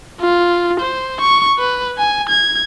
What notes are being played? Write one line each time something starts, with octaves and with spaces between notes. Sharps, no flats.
F4
C5
C#6
B4
G#5
G#6